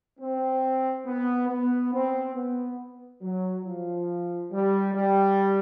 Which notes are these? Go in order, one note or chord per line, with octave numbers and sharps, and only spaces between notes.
C4
B3
B3
C4
B3
F#3
F3
G3
G3